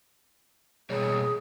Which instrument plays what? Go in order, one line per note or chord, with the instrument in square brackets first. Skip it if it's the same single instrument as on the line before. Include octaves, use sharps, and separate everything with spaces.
[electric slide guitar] B2 G3 C#5 [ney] G#4